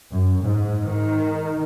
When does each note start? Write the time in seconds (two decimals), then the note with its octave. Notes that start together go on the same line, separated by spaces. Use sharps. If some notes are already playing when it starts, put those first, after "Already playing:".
0.11 F#2
0.41 G#2
0.83 D#3